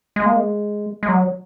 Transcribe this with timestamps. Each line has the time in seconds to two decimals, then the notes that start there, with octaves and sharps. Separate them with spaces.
0.16 G#3
0.26 A#3
0.36 G#3
1.03 G#3
1.08 F#3